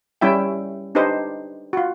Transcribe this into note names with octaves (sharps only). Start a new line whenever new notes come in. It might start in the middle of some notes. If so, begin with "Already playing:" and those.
G3 C#4 E4 E5 G5
D4 D#4 G4 B4 C5 D#5
F4 F#4